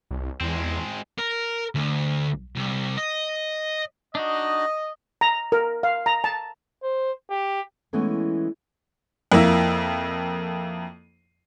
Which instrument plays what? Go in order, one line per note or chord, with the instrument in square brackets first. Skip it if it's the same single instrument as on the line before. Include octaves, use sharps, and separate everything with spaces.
[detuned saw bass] C2
[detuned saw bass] E2 [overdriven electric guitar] G#3 C4
[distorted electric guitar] A#4
D2
C2
D#5
[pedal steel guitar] D4 D#4 F#4 [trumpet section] D#5
[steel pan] A#5
A#4
F5
A#5
A5
[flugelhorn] C5
G4
[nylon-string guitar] E3 G#3 A3 B3 C#4
[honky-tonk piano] F2 A#3 E4